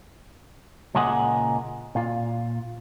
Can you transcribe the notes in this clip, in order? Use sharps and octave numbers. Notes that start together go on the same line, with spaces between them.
C#2 A#2 G#3 G#4 F#5
A#2 F4